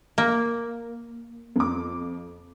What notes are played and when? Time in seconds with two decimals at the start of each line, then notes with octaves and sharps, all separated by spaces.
0.18 A#3
1.56 F2 D6